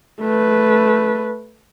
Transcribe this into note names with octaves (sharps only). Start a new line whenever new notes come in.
A3 B4